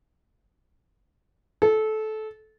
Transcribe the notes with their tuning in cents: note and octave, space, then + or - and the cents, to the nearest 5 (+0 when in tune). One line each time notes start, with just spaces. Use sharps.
A4 -20